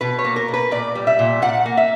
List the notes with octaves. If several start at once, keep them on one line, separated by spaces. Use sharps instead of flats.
B2 B4
C#5
A#3
A#4
B2
B4
A#2 D5
G3
E5
A#2
A#2 F#5
A#3
E5